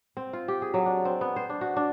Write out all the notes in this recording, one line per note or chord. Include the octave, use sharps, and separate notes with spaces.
C4
F4
G4
G#4
F#3
D4
C4
B3
C5
D4
F#4
D4